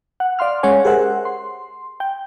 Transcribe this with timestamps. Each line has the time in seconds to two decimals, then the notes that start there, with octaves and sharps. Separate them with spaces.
0.20 F#5
0.39 D5 F5 C6 F6
0.63 G#3 C#4 C#5 F#5 G#5
0.85 G4 G#4 A#4 C5 E5 F#5
1.25 C6
2.00 G5